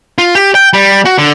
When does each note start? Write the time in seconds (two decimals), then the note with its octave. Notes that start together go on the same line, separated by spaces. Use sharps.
0.18 F4
0.35 G4
0.55 G5
0.73 G3
1.05 F#4
1.18 D3